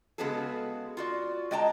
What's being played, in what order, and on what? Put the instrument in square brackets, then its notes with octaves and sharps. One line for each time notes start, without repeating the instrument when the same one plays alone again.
[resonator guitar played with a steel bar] C#3 G#3 B3 F#4 G#4 A4
F4 F#4 D5
G#3 D#5 G5 A5 A#5